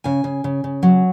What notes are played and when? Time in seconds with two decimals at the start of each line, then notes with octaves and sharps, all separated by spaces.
0.04 C#3 G#5
0.24 C#3
0.44 C#3
0.64 C#3
0.83 F#3